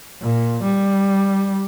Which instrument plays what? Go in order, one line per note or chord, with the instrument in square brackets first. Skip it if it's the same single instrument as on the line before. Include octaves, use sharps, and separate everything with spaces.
[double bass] A#2
G3